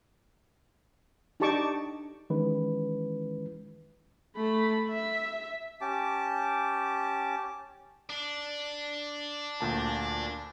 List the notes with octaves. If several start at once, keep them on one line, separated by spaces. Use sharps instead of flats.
D4 D#4 G4 A5 C#6 D6
D#3 E3 G#3 C#4 E4 B4
A3 B5
E5
C#4 G4 A5 D6
D4
D2 A#2 A5